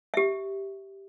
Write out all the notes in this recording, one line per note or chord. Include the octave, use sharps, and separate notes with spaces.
G4 E5